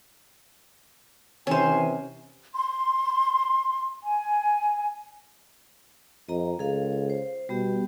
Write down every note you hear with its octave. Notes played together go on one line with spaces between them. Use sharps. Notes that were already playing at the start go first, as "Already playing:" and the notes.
C3 D#3 E3 C#4 C5 G#5
C6
G#5
F2 D#5 A#5
C#2 G#4 A4 F5
C5
B2 G3 B3 G4